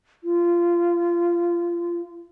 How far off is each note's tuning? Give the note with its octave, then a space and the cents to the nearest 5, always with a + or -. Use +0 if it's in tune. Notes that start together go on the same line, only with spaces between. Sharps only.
F4 -20